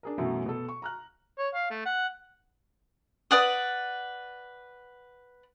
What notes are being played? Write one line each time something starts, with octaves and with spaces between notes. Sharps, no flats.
D4 G#4 A#4
F#2 B2 E3 F#3 A3 F#4
B2 A4
C#6
A#5 F6 F#6
C#5
F5
A3
F#5
B4 D5 F#5 D#6